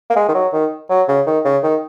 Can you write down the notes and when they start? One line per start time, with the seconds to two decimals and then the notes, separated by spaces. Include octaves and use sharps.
0.10 A#3
0.16 G#3
0.29 D#3
0.34 F#3
0.53 D#3
0.89 F#3
1.08 C#3
1.26 D#3
1.45 C#3
1.63 D#3